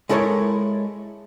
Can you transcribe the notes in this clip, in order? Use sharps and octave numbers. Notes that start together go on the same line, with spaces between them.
G#3 E4 A4 A#4 C#5